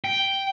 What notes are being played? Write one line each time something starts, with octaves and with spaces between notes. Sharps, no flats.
G5